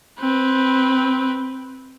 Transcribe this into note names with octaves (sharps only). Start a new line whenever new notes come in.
C4 B4